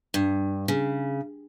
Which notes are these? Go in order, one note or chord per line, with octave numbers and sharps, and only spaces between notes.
G2
C#3